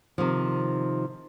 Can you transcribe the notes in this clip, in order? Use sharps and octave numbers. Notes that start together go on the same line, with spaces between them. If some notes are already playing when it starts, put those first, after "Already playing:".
C3 D#3 F3